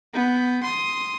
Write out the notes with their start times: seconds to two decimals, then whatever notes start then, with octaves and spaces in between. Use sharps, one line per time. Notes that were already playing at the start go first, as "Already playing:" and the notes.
0.14 B3 G6
0.63 C6 D#6